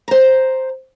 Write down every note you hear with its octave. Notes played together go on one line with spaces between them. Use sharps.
C5 A#5